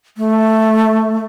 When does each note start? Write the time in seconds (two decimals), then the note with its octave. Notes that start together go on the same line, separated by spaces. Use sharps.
0.17 A3